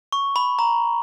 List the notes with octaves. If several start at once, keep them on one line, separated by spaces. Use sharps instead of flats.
C#6
B5
A#5